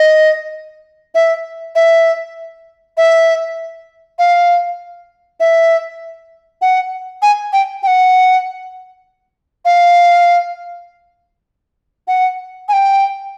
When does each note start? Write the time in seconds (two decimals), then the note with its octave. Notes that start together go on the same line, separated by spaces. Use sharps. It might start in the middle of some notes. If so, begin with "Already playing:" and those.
Already playing: D#5
1.15 E5
1.75 E5
2.97 E5
4.19 F5
5.40 E5
6.62 F#5
7.22 G#5
7.53 G5
7.83 G5
7.87 F#5
9.65 F5
12.08 F#5
12.69 G#5
12.73 G5